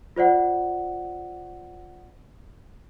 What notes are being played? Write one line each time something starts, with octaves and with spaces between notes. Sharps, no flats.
F4 C5 D5 F#5